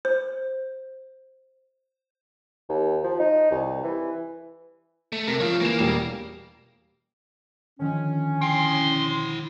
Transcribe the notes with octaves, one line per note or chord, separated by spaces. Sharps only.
C5
D#2
F3
D#4
C2
E3
A3
C3 A#4
F3 C#5 F5
E3 A#3 E7
E1 G3 E7
D3 D#3 F3 C#4
E4 G5 C6